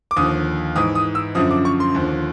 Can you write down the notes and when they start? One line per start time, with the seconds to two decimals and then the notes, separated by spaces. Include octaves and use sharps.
0.11 D6
0.17 D#2 D3 F3 D#6
0.76 G#2 E3 D#6
0.95 D#6
1.15 E6
1.35 F#2 D3 F3 D#6
1.51 D6
1.65 C#6
1.80 C6
1.95 D#2 D3 F3